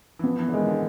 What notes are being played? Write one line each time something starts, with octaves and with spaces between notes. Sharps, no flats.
E3
F3 B3
E3
D3
D#3 G#3
D3